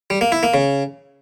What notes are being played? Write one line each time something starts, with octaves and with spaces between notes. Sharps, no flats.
G3
A#3
E4
A#3
C#3